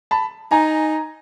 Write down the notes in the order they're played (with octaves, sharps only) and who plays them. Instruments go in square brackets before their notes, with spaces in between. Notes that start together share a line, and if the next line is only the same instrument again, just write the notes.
[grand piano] A5 B5
[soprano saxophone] D#4 [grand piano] G#5 A#5